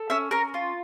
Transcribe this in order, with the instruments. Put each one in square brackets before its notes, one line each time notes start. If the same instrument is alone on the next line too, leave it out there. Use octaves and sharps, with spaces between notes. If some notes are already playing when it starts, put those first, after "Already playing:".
Already playing: [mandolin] A4
C#4 E5 E6
C#4 A#4 A#5
F4